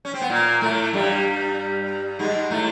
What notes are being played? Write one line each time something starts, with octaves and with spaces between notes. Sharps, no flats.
C#4
C4
B3
A#2 A#3
A2 A3
G2 G3
G#2 G#3
A2 A3